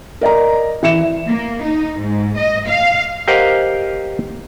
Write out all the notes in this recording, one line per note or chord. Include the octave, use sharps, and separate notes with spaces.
A#4 D5 D#5 A#5
E3 E5 C#7 E7
A#3
D#4
G#2
D#5
F5
G4 A#4 C5 D#5 F5 F#5